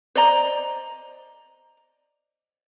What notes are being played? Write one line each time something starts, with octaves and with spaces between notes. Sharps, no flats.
C5 D5 D#5 A#5